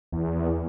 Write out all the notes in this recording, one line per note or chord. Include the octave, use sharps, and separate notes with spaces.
E2